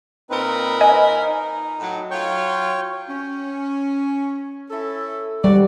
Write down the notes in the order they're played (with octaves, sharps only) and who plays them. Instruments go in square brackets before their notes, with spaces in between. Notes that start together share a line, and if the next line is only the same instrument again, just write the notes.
[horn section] A#2 A#4 B5 [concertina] C4 D#4 B4
[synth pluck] D#5 G#5
[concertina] D#4
[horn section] A2 F#3
[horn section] F#3 F4 [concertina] C#5 G5 C#6
[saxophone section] C#4
C#4 E4 A4
[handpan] G3 [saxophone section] F#4 D5